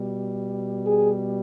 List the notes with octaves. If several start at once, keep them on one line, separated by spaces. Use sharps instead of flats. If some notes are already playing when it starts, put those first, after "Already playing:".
Already playing: B2 G3
G#4